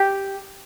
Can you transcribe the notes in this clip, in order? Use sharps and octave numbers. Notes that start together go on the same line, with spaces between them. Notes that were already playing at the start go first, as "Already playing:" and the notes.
Already playing: G4